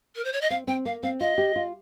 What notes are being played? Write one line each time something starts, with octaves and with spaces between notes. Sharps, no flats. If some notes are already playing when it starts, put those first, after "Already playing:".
A#4
C5
C#5
D#5
C4 F5
C4 G5
A#3 F5
C4 F5
F4 D#5
G4
F4